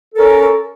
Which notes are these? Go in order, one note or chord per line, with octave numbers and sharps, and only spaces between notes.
C#4 A4 A#4